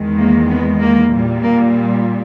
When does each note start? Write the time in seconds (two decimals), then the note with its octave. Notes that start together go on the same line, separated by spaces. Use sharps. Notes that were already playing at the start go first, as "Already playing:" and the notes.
Already playing: E2 D#3 G#3
0.18 A#3
0.48 B3
0.80 A#3
1.10 A#2 G3
1.42 A#3